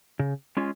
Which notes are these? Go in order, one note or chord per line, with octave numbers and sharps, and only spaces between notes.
C#3
G#3 C#4 F4